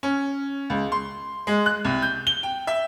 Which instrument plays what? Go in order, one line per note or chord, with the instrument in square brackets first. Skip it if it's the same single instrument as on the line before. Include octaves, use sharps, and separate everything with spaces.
[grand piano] C#4
C#2
C6
G#3
F#6
C2
G6
G7
G5
E5